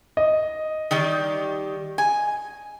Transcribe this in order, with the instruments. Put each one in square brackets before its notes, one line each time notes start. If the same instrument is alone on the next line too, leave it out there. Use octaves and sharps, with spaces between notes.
[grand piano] D#5
[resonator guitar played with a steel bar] D#3 G3 G4
G#5